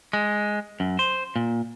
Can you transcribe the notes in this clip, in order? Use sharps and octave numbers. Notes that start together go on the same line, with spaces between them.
G#3
F#2
C5
A#2